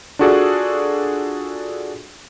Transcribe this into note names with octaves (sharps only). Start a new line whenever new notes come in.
D4 F4 F#4 G#4 A4 D5